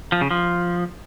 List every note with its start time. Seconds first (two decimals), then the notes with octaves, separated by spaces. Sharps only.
0.12 F3
0.21 C#3
0.31 F3